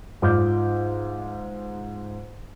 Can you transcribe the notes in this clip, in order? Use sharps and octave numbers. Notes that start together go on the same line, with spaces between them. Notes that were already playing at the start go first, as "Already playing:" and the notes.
G#2 F4 D6 F6 G6